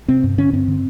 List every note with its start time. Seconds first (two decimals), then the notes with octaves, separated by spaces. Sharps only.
0.08 C3 C4
0.24 G2
0.38 D3 C#4
0.53 G2 C4
0.68 D3